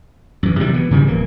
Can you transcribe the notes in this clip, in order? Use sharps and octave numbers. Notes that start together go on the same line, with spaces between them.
F#2 E3
C3 D#3 F#3 G3
E3 B3
G2 C#3 F3 G3
D1 E3 A#3